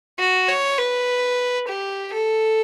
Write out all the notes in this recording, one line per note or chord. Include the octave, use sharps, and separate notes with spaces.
F#4
C#5
B4
G4
A4